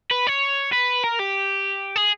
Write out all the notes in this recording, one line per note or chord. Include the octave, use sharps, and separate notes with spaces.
B4
C#5
B4
A#4
G4
G#4